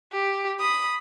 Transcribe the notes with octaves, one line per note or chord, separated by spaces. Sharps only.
G4
B5 D#6